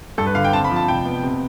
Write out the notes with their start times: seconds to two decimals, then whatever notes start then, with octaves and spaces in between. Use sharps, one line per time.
0.18 G2 A4
0.26 B4
0.35 D3 F5
0.44 G5
0.53 C4 A5
0.64 B5
0.71 F3
0.76 A5
0.88 F1 G5
1.05 B3
1.23 C3